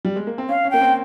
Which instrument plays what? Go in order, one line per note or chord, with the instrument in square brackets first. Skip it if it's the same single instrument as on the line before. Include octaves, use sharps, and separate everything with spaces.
[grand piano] G3
G#3
A#3
C4
[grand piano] C#4 [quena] F5
[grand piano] C#4
[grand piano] A#3 [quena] G5
[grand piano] C4